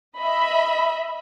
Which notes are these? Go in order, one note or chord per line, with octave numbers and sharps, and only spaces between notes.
D#5 E5 B5